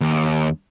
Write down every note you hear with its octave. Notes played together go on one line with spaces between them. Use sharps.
D#2